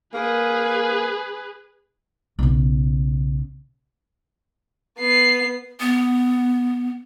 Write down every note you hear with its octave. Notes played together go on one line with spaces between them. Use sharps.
A#3 G#4 B4
B1 C#3
B3 C7
B3